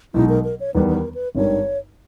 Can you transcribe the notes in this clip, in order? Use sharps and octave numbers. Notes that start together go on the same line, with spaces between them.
B1 B2 G#3 D#4 E4
A#4
A#4
C#5
E2 D#3 G3 B3 B4
B4
A#4
B4
G#1 G2 D#3 G3 C#5